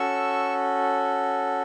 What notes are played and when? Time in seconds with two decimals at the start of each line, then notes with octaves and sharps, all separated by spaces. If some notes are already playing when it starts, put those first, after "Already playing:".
Already playing: C#4 F#4 A4 C#6 E6